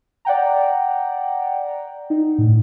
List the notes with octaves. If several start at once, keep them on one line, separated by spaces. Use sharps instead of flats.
D5 F#5 G5 A#5
D#4
A2